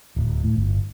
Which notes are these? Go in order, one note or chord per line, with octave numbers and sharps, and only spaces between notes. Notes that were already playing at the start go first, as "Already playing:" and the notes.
D1
A2
G1